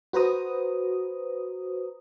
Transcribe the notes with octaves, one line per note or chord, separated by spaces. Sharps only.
F#4 B4 C5 A#5 D#6